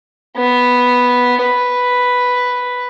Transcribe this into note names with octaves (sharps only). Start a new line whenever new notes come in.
B3
B4